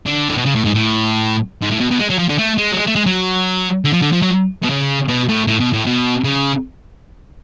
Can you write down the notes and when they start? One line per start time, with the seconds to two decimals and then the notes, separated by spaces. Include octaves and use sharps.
0.06 D3
0.29 A2
0.37 B2
0.45 C#3
0.55 A2
0.65 G#2
0.75 A2
1.62 G#2
1.70 A2
1.80 B2
1.90 B2
1.99 G#3
2.10 F#3
2.19 F3
2.29 D3
2.38 A3
2.58 G#3
2.72 F#3
2.77 G#3
2.87 A3
2.95 G#3
3.06 F#3
3.85 D3
3.93 F3
4.02 D3
4.13 F3
4.22 F#3
4.63 B2
4.70 C#3
5.08 B2
5.28 A2
5.47 A2
5.60 B2
5.73 A2
5.86 B2
6.24 C#3